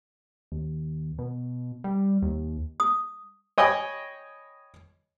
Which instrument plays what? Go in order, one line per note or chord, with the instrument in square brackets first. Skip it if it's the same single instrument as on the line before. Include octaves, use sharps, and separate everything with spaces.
[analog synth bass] D#2
B2
G3
D#2
[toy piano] D#6
[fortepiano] C#5 D#5 G5 G#5 B5 D#6